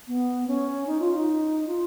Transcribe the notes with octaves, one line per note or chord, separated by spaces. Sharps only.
B3
C#4
D#4
F4
D#4
F4